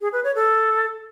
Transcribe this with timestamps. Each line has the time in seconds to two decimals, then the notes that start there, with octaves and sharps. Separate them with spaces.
0.01 G#4
0.13 B4
0.24 C#5
0.35 A4